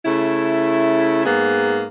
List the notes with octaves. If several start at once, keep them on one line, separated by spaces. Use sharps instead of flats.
C#3 A3 E4
G#2 A#3 B3 G#4